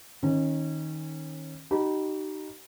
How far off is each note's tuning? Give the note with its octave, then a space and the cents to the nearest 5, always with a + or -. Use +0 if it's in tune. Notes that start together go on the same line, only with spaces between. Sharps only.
D#3 +10 C#4 -25
D#4 -10 G4 -40 B5 -20